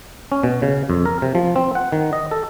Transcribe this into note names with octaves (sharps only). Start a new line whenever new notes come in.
C#4
B2
C#3
F2
A#4
C3
F3
C4
F#5
D#3
D#5
A4